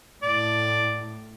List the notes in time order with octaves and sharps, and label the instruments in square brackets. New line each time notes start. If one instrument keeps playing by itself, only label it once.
[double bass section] A2 [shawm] D5